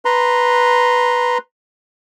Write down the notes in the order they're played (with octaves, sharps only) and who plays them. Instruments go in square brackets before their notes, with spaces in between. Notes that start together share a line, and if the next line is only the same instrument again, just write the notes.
[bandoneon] B4 A#5 C6